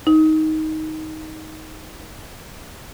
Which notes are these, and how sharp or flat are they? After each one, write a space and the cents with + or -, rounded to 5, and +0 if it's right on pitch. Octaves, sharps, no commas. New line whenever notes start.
D#4 +15